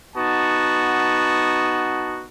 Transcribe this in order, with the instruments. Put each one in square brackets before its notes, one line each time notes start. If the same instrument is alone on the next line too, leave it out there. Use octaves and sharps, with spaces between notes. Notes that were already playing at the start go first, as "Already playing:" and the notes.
[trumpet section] B3 D#4 F#4 A5